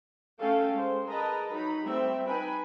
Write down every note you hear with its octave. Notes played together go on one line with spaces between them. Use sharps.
A3 C#4 A4 F5 G5
G#3 C5
G#4 A#4 B4 D#5 A5 A#5
F#3 D#4 A#5 B5
G3 A3 C4 E5
D#4 B4 G5 G#5 B5